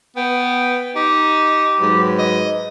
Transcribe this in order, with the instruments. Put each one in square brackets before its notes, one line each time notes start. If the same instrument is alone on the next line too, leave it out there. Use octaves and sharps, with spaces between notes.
[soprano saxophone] B3 [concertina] G5
[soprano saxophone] D#4 [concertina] G4
[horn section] G#2 F#3 B4
[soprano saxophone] D#5